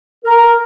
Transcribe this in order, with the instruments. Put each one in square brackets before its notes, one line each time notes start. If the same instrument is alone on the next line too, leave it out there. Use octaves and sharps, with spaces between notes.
[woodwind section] A#4